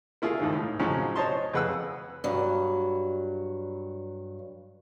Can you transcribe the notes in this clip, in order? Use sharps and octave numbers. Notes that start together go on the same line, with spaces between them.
A#3 E4 F4 G#4
D#2 G#2 D#3
A2
A2 C#3 F3 F#3 C#4 D#4
C5 C#5 D#5 A5 C6
F2 G#4 B4 F#5 E6
G2 F#3